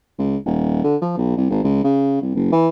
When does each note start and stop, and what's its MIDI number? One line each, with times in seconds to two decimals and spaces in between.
0.19 0.37 37
0.46 0.80 27
0.84 0.96 50
1.02 1.17 53
1.17 1.34 35
1.37 1.49 36
1.50 1.63 32
1.64 1.82 37
1.84 2.19 49
2.22 2.31 36
2.35 2.50 30
2.52 2.69 52